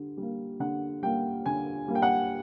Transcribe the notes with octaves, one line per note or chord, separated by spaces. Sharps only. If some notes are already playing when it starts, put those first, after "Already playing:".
Already playing: D3 G3
G3 A#3
D3 F#5
G3 A#3 G5
D3 G#5
G3 A#3
G5
F#5